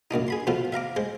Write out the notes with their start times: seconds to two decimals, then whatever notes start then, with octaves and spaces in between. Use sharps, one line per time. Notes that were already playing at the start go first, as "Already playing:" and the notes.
0.11 F#2 A#2 D4 D#4
0.28 G#4 B5 C6
0.47 B2 F3 F4 A4 B4
0.73 E5 F5 A#5 D6
0.96 G#3 C5